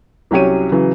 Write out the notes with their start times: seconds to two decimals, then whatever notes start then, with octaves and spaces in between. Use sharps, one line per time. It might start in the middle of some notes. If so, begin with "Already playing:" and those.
0.31 C2 F#3 C#4 G4 C#5 D#7
0.72 C#3 E3 F#3